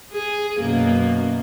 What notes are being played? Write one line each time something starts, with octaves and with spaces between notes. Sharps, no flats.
G#4
F#2 B2 A#3